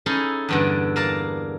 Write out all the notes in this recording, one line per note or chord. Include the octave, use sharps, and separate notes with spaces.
C#4 D#4 E4 G#4 A4
E2 G2 D3
A#3 A#4 D5 A5